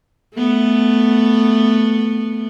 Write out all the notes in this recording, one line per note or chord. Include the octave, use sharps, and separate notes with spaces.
A3 B3